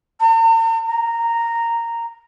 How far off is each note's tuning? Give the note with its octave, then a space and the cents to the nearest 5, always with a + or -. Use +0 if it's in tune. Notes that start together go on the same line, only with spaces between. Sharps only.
A#5 -45
A#5 -10